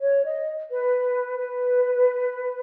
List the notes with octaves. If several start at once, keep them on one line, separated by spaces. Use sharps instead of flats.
C#5
D#5
B4
B4